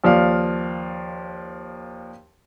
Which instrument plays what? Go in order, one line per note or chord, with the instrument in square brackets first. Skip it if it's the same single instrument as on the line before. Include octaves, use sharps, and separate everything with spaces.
[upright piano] D#2 F3 D5 F5